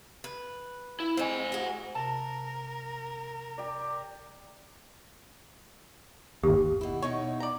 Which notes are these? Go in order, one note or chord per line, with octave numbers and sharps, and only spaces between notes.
B4
E4
G#3 C4 C5 G#5
F#4 G#4
C3 A#4 A5
G4 D5
G1 D#2 G4
B2 E4
B2 D#4 E4 C#5
D5 A#5